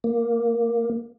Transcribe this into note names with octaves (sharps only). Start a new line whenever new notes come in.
A#3